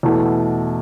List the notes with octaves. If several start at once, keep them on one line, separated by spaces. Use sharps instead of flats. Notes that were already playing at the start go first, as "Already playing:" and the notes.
E2 B2 A3 E4